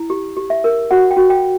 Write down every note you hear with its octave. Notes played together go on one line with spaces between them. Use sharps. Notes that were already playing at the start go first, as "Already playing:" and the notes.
Already playing: E4
G4
G4
E5
A#4
F#4 F#5
G5
F#4
G5